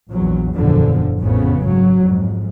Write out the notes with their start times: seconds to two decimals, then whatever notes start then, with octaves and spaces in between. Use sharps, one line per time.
0.11 A#1 E2 F#3
0.54 F#1 E2 A#2 D3 F3
1.20 A1 F2 C#3 B3
1.66 G#2 F#3
2.04 F2 G#2